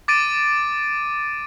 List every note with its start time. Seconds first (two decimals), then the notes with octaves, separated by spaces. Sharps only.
0.08 D6 A6 D7 D#7